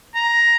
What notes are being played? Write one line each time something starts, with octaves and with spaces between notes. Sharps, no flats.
A#5